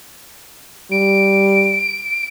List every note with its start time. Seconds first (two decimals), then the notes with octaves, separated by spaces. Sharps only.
0.92 G3 D7